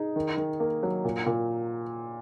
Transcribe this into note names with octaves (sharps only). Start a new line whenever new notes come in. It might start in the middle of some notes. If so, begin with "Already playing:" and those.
Already playing: D#4 G#4
D#3
D#3
A#3
F#3
A#2
A#2